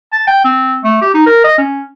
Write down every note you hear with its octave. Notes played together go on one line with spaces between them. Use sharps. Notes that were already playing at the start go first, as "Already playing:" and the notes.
A5
G5
C4
A3
G4
D#4
A#4
D#5
C#4